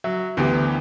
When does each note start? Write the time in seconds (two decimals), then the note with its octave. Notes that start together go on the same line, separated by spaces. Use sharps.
0.04 F#3 E5
0.37 D2 E3 B3 G4